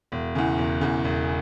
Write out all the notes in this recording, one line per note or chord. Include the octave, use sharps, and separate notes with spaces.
E1
E2 C#3
E1
E2 C#3
E1